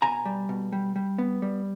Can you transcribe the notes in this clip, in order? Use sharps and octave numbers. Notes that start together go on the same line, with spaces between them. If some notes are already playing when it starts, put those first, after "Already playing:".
B2 G#5 A#5
G3
B2
G3
G3
B3
G3